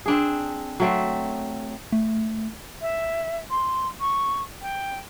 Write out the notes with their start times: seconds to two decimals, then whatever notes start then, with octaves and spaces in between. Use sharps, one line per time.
0.06 C4 D4 G#4
0.80 F#3 A3 C4
1.92 A3
2.82 E5
3.50 C6
4.00 C#6
4.62 G5